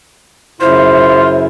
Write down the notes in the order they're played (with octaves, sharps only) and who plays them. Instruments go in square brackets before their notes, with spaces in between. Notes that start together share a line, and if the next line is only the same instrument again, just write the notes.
[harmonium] F#2 C#3 E4 [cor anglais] F4 [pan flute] C5